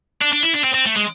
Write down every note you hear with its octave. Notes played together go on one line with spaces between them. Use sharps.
D4
D4
E4
D4
C4
C4
A3
G#3